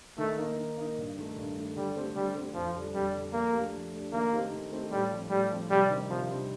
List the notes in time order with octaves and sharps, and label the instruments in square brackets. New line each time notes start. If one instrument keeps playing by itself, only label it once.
[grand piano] D#3 [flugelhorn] A3
[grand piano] A#3 D#4
D#3
A#3 D#4
G2
D#3 A3
G2
D#3 A3
[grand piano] D3 [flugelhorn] G3
[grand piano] A3 C4 G4
[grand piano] D3 [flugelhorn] G3
[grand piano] A3 C4 G4
[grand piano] F2 [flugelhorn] F3
[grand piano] D3 G3 D4 A4
[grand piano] F2 [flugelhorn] G3
[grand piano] D3 G3 D4 A4
[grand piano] F3 [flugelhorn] A#3
[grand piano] A3 D4 G4
F3
A3 D4 G4
[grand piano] D#3 [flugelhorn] A#3
[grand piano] A3 C4 D#4 G4
D#3
A3 C4 D#4 G4
[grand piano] A2 [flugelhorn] G3
[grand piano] F3 C4
[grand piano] A2 [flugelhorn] G3
[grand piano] F3 C4
[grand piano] C3 [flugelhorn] G3
[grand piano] D#3 G3 C4
[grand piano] C3 [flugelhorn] F3
[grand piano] D#3 G3 C4